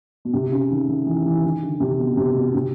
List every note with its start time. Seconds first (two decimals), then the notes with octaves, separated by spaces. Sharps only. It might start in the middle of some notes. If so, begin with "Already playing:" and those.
0.25 B2
0.33 C3
0.52 C#3
0.71 D#3
0.88 D#3
1.06 E3
1.26 E3
1.44 D#3
1.63 D3
1.80 C3
1.99 B2
2.10 B2
2.17 C3
2.36 B2
2.55 C3